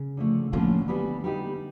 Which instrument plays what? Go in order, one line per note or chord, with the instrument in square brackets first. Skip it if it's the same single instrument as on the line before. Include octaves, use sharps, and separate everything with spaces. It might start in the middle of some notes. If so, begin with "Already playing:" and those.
Already playing: [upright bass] C#3
[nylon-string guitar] D3 F3 A3
[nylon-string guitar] A2 F3 A#3 C#4 F4 [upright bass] D3
[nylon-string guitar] G3 B3 E4 G#4
G3 B3 D#4 G4